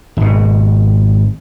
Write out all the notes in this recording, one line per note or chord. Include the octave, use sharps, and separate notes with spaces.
G#1 B2